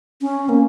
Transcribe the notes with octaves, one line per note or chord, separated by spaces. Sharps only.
C#4
A#3